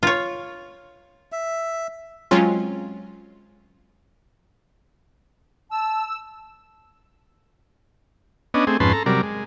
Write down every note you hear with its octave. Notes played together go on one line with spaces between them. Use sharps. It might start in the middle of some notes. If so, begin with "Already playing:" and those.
F4 C#5
E5
F#3 G#3 C4 C#4 F4
A5 E6
B3 C#4 D4 D#5
A3 C4 G#4
F2 G#2 C#4 B4 A5 C6
A4 A#5
C3 F#3 G3 A#4 D5
G#3